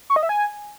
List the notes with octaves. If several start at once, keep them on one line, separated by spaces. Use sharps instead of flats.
C#6
D#5
E5
G#5